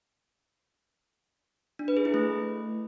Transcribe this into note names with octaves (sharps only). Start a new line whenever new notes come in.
D4
B4
G#4
E4
A3